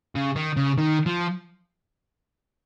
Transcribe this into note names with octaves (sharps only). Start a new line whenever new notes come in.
C#3
D#3
C#3
D#3
F3